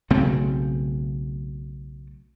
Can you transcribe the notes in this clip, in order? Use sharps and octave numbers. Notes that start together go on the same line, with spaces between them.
B1 C#3 A3 C4